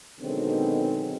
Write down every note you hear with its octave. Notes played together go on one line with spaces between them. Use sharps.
B2 D3 D#3 F#3 G#3 C4